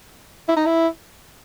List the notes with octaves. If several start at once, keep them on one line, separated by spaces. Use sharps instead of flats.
E4
D#4
E4